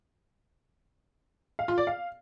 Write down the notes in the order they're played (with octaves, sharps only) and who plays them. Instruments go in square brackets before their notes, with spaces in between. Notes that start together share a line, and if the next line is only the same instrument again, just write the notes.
[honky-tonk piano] F5
F4
D5
F5